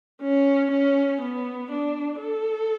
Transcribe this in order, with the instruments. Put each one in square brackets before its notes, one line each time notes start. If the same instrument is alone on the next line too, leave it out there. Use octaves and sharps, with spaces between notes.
[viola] C#4
C#4
B3
D4
A4